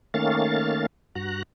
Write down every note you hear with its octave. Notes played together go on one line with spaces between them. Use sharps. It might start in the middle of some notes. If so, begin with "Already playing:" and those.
D#3 A3 A#3 C#4 F5 A6
G2 F#4 A#5 F#6